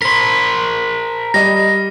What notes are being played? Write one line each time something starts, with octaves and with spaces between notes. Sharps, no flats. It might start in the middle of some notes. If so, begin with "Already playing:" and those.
A#4 C5 B6
G3 D#5 A#6